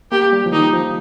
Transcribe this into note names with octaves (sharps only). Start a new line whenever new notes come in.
A#3 G4
G3
F3
D#3 D#4
F3